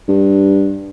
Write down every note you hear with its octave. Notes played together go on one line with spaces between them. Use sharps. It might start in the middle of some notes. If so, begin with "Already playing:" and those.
G2